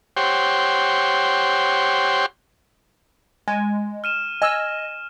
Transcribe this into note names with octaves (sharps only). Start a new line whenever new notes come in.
G4 C5 C#5 F#5 G5 C6
G#3 G#5
F6 D#7 E7
D#5 G#5 E6